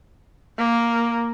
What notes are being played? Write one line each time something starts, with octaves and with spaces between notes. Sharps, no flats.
A#3